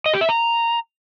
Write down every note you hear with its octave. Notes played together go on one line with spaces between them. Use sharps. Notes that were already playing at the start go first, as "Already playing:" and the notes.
D#5
G4
E5
A#5